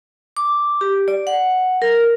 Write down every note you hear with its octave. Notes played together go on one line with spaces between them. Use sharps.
D6
G4
D5
F#5
A#4